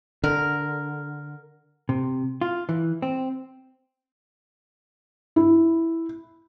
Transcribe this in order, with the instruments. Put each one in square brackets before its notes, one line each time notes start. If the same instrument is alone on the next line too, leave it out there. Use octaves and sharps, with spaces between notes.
[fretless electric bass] D3 [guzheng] A#4
[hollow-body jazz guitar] C3
F4
E3
C4
[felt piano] E4